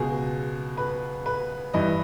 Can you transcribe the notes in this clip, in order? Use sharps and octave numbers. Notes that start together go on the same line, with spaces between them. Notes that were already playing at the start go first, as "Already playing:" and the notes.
Already playing: C#2 B2 G#4
B4
B4
G2 E3 D#5